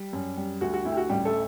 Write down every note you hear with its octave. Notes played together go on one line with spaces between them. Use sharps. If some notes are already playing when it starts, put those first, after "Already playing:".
Already playing: G3
F#2
G3
D2 F#4
F#4
D2 E4
G4
F#4
A1 G3 G4
A3 A4